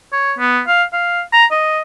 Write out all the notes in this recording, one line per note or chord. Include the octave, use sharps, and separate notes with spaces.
C#5
B3
F5
F5
A#5
D#5